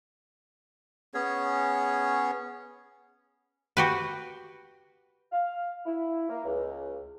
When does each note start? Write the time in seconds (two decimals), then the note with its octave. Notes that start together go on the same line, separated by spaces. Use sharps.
1.14 B3 C#4 G#4 C#5
3.77 F#4 G4 B4
5.32 F5
5.86 E4
6.29 A#3
6.45 C#2